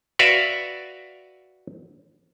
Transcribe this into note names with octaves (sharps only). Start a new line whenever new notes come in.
F#4 B4 D5 E5 F5